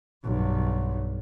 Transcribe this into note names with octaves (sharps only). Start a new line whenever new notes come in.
B1 G2